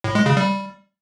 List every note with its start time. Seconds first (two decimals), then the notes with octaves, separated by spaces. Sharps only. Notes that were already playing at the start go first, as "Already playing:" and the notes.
0.04 A2
0.15 G#3
0.26 C#3
0.37 G3